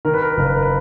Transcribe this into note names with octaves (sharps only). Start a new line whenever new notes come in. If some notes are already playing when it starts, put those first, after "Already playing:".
D#3 A#4
B4
A#4
B4
F#1 A#4
B4
A#4
B4